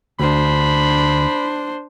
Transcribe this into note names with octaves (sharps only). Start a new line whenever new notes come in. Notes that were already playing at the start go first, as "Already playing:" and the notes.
D2 D4 C5 B5